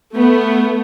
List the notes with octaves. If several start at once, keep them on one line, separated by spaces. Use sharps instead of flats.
A3 B3